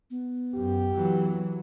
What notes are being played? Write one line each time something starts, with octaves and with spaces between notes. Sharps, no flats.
B3
F#2 G4
E3 F#3